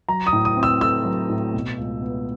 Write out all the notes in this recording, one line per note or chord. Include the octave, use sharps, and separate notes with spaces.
F#3 A#5
D#6
A2
D#6
C4
E6
A3 E6
F#3
A2
B2
C#2
B3